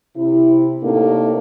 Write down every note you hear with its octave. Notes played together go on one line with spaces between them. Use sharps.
C3 E4
A2 C3 A#3 D4 D#4 A4